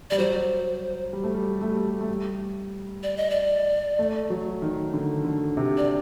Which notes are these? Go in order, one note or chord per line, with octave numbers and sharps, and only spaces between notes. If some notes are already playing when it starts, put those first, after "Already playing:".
G3 D5
F#3 C5
G3
A3
G3
A3
G3
A3
A3
G3
D5
D#5
D5
A3
F#3
D#3
D3
D3
C3
D5